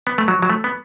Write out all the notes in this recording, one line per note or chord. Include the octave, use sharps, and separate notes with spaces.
B3
A3
F#3
F#3
A3
B3